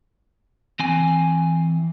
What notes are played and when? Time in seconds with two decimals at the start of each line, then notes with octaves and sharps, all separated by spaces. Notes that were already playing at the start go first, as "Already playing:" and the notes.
0.79 E3 C4 G#5